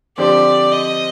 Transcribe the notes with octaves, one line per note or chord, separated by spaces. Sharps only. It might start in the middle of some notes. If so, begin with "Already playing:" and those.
D3 F3 C4 G4 C5 D5
D#5